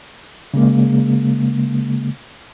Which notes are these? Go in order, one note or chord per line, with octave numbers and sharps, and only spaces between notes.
C#3 G#3 A#3